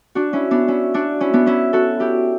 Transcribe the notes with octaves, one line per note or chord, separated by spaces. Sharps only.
D4 F#4
C#4 E4
B3 D4
C#4 E4
D4 F#4
C#4 E4
B3 D4
C#4 E4
F#4 A4
E4 G4